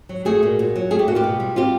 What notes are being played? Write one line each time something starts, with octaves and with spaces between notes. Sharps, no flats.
F#3
A3 F#4 G#4
A#2
A#2
F#3
A3 G#4
G4
A#2 F#4
F4 G4
B2
G3
C4 F4 G4